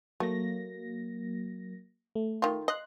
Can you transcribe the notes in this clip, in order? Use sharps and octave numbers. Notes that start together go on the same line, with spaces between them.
F#3 A3 A#3 A#6
A3
D#3 F4
D#5 C6 F#6